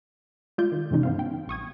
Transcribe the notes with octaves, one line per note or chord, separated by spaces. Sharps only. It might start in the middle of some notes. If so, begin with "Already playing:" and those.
G#3 F4 D5 G6
D#3
G2 C3 E3 G#3 C#4 D#4
B3 C4 F5
G5
A#1 C#6 D#6 G#6